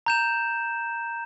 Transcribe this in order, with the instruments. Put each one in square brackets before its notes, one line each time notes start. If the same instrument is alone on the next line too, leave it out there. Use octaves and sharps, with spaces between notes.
[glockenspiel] A#5 G6 E7